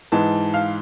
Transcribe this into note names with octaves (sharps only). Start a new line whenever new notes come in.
G#2 E3 G#3 A5
F5